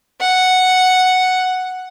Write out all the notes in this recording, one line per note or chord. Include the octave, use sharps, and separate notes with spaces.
F#5